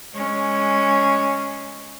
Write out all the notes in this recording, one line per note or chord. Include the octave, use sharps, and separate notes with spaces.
G#3 C#4